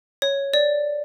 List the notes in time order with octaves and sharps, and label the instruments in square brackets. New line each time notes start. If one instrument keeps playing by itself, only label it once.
[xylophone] C#5
D5